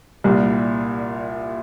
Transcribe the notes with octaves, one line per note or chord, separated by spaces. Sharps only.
C2 A#2 G3